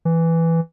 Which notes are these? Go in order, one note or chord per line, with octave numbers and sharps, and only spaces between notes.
E3